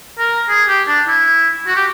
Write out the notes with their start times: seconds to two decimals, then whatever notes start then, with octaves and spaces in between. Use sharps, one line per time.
0.19 A#4
0.49 G#4
0.68 G4
0.88 D4
1.08 E4
1.67 F#4
1.76 G4